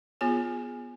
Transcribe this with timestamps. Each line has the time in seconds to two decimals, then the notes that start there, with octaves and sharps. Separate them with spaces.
0.21 B3 F4 G#4 C#5 G#5